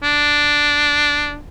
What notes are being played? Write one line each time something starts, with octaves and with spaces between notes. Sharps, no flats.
D4